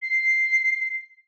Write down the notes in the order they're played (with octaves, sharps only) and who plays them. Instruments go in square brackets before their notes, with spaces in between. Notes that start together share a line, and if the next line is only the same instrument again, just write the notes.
[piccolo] C7